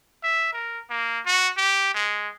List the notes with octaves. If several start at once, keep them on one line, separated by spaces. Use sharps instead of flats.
E5
A#4
A#3
F#4
G4
G#3